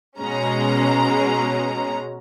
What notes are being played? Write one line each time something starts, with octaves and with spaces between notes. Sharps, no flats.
B2 G#3 C#4 A#5